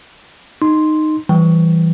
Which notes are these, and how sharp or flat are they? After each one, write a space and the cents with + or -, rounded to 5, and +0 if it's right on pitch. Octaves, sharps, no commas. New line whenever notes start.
D#4 -10 C6 +0
E3 +0 G3 -20 G5 -20